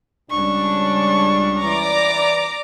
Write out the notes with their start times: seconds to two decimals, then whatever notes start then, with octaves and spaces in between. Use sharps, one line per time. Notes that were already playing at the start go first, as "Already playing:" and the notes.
0.31 C#2 G3 C#4 D4 C#6
1.61 E3 D5 A#5 D6